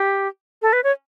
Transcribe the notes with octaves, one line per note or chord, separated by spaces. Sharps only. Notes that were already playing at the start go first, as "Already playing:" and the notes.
Already playing: G4
A4
B4
C#5